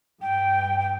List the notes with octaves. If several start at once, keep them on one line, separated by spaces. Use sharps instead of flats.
G2 G5
G5